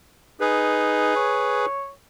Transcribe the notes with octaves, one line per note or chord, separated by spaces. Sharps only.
D#4 G#4 B4
C#5